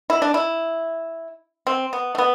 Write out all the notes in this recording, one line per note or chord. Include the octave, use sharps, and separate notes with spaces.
E4
D4
E4
C4
B3
A3
B3